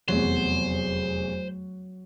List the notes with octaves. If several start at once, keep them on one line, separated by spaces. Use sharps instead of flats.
F1 E2 F#3 C5